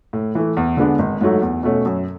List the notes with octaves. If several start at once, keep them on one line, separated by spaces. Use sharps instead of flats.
A2
E3 A3
E2
D3 G#3 B3 D4
G#1
G#2 F#3 A3
E2
B2 A3 C#4
F#2